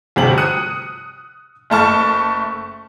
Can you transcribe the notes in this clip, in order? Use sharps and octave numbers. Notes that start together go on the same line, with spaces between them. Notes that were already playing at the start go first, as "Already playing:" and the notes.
G1 D2 C3 F3 G4 F#7
D#6 F#6 C#7 D#7
F#1 A3 A5 C#6